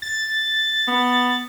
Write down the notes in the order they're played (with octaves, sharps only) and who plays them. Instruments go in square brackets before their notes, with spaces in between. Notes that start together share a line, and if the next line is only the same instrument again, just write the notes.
[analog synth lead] A6
[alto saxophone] B3